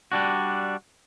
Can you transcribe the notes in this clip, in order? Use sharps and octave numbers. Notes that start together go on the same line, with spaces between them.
G3 D4 F#4